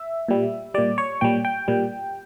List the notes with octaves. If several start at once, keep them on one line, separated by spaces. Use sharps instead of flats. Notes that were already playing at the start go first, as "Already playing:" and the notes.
Already playing: E5
A#2 G3
A#2 G3 D5
C#5
A#2 G3 G5
G5
A#2 G3